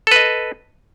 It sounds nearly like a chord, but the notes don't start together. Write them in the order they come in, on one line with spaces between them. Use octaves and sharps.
A4 B4 D#5